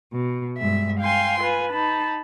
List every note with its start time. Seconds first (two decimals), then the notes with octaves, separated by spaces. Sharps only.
0.12 B2
0.58 G2 G#3 E5
1.00 F5 G5 G#5 C6
1.40 F4 B4 G#5
1.71 D#4 A5 B5